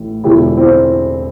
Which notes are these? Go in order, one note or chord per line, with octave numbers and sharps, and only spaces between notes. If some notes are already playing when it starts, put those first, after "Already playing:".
Already playing: A1 A2 E3
E1 E2 D3 F3 E4 G4
C4 E4